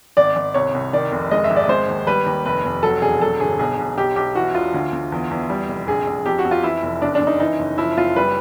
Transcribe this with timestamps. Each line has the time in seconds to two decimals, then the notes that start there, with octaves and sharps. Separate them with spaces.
0.17 G#1 D5
0.36 G#1
0.54 C2 C#5
0.74 C2
0.93 D#3 D5
1.12 F1
1.31 G#3 D#5
1.44 E5
1.50 G#1
1.56 D5
1.69 G#3 C5
1.88 D#2
2.07 G3 B4
2.26 D#2
2.45 F1 B4
2.65 F1
2.83 F#3 A4
3.02 E1 G#4
3.21 F#3 A4
3.40 G1 G#4
3.59 B1 G#4
3.79 B1
3.97 B1 G4
4.16 B1 G4
4.35 E3 F#4
4.54 E1 F4
4.74 D2
4.93 D2
5.12 E2
5.31 E2
5.50 G3
5.68 F1
5.87 A#1 G#4
6.07 A#1
6.26 F2 G4
6.39 F#4
6.45 F2
6.51 F4
6.64 E3 E4
6.83 F1
7.02 F#1 D4
7.15 D4
7.21 F#1
7.27 D#4
7.40 E3 D#4
7.59 F#1
7.78 F3 E4
7.97 F#1 F4
8.16 G3 B4